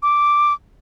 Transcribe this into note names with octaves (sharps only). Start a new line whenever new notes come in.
D6